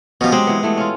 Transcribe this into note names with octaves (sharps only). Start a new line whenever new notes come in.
B2 F3 C#4 G4
F#3 G#3 C4 G4
E3 B3
E3 A3 B3
C#4 F4